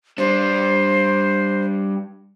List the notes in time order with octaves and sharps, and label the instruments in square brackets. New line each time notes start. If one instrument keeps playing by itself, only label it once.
[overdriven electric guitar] G3 D4 [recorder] C5